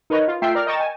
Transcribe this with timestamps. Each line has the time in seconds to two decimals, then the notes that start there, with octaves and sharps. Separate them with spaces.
0.10 D#4 A#4 B4 C#5 D#5
0.28 F4
0.42 A3 F4 E5 G5 C7
0.55 A#4 D5 F6
0.66 D#5 G5 A#5 C#6 A6 E7
0.80 G#5